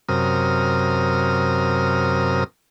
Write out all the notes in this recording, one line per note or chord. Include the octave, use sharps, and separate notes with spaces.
F#2 C3 A#4 D#6 F6